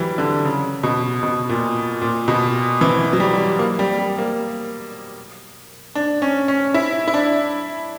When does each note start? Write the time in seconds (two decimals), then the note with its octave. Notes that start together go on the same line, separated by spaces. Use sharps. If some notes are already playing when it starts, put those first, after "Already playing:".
Already playing: E3 F#3 G3
0.18 D3
0.45 C#3
0.83 B2
1.23 B2
1.49 A#2
2.02 A#2
2.28 B2
2.81 E3
3.13 F#3
3.20 G3
3.59 A#3
3.79 G3
3.99 G3
4.18 A#3
5.95 D4
6.22 C#4
6.48 C#4
6.74 E4
7.08 E4
7.14 D4